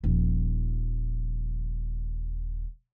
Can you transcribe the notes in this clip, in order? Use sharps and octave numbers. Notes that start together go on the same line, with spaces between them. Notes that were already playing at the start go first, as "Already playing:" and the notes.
D#1 F3